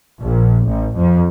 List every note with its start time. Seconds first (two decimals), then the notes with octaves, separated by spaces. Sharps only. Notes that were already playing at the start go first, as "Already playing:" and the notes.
0.21 A#1
0.67 A1
0.97 F2